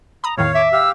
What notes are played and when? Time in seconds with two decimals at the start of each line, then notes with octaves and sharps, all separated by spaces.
0.24 A#5 B5 D#6
0.38 E2 A2 D#3 C#5 F5
0.55 E5 D6
0.72 G4 F5 E6